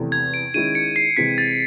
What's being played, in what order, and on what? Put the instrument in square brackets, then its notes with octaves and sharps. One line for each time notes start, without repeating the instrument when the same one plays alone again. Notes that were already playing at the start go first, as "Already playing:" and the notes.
Already playing: [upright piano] E2 C3 E3 A3
[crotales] G#6
D7
[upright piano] D#3 G#3 C#4 E4 [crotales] D#7
[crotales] C#7
C7
[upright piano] C3 E3 G#3 C4 [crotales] B6
[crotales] A6